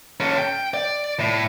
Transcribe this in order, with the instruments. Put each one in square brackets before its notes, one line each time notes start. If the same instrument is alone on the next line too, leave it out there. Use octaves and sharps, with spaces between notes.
[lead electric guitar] C#4 A4
G5
D5
A2